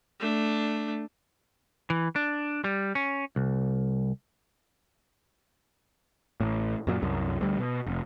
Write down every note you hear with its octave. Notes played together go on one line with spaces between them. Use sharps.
A3 D4
E3
D4
G3
C#4
C2
A1 A2
F#2 A#2 F#3
C2 F#2
D2 G3
B2
F1